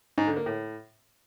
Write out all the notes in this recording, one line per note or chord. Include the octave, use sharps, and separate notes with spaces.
G#2
D3
A#3
A2